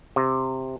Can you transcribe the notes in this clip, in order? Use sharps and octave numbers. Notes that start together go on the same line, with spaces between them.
C3